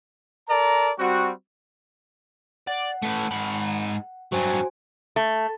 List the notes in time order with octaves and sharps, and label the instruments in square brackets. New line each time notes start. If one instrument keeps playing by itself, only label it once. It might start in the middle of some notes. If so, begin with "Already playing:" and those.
[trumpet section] A4 A#4 D5 A5 A#5
G3 C4 F#4
[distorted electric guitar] D5 [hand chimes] F#5
[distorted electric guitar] A3 B4
G#2 B5
[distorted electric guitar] G2 F#3 [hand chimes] F#4 C5 G#5
[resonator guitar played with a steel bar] A3